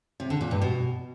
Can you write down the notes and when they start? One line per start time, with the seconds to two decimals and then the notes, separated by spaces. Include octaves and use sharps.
0.20 C3
0.30 D3
0.41 A#2
0.51 G2
0.62 B2